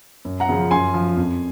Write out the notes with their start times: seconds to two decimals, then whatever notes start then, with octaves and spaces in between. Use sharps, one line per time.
0.25 F#2
0.40 F#5 A#5
0.49 C#3 F3
0.71 F#2 G#5 C6
0.94 F3
1.17 F2